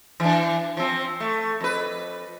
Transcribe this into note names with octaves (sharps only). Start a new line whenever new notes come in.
E3 D4
F3 C4
A3
F2 B4